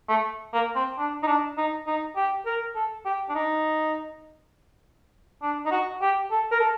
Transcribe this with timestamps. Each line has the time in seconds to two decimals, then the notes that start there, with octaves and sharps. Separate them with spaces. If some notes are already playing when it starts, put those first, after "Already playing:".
0.09 A3
0.53 A#3
0.76 C4
0.98 D4
1.23 D#4
1.27 D4
1.57 D#4
1.87 D#4
2.16 G4
2.46 A#4
2.75 A4
3.05 G4
3.29 D4
3.35 D#4
5.42 D4
5.66 D#4
5.71 F#4
6.02 G4
6.31 A4
6.51 A#4
6.60 A4